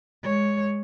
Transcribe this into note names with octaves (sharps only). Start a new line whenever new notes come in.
G#3 C#5